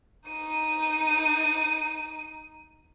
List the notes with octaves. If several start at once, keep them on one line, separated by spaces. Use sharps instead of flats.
D#4 D#7